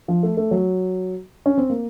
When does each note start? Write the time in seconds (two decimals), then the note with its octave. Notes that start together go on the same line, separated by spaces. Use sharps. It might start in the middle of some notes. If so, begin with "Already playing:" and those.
0.08 F3
0.23 A3
0.37 A3
0.51 F#3
1.46 C#4
1.58 C4
1.70 A#3